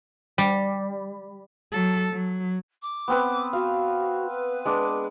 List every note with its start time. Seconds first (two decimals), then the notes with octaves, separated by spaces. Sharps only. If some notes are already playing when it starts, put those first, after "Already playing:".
0.38 G3
1.72 F#3 A4
2.13 F#3
2.82 D6
3.08 B3 C4 B4
3.53 F#4 F5
4.29 B4
4.65 G#3 D4 D6